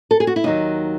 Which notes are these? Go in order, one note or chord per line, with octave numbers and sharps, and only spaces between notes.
A4
G#4
F#4
E4
D#2 D#3 F#3 D#4